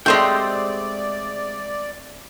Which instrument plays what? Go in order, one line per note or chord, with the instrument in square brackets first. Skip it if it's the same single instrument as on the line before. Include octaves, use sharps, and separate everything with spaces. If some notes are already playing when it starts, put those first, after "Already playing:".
[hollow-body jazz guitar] G#3 C5 G5 [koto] A3 C4 G4 [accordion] D5